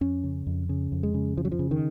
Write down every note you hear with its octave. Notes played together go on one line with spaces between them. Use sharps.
F2 C#4
C#3
F2
C#3
F2
G#3
C#3
F2 F3
F#3
F3
C#3
D#3